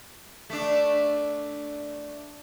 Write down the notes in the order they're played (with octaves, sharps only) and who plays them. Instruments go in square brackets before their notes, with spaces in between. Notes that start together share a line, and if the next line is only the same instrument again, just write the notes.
[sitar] A3 D4